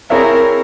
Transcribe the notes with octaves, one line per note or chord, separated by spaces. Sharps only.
C4 E4 G#4 A#4 C#5 E5